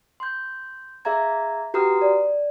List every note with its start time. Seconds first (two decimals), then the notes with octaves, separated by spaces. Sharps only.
0.20 C6 G6
1.05 G#4 E5 F5 A#5 G#6
1.74 F#4 G4 B4 A#5 D#6 F6
2.02 D5